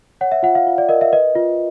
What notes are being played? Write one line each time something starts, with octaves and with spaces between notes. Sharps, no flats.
C#5 F#5
E5
F4 F#5
F5
F4
D5
A#4 D#5
E5
B4 D#5
F4